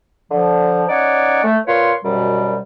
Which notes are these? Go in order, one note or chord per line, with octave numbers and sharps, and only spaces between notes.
D3 F3
C#4 D#4 C#5 D5 F#5
A3
A#2 F4 B4 C#5 C6
C2 F#2 B2 G3